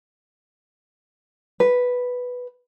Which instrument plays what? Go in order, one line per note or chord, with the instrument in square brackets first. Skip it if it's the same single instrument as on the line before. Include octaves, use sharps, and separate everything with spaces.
[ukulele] B4